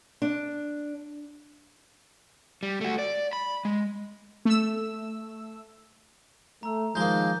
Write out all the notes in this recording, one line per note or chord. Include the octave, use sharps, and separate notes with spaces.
D4
G3
A3 F#4
D5
B5
G#3
A3 E6
A3 A#5 E6
D#3 F3 G#3 A#3 G6 G7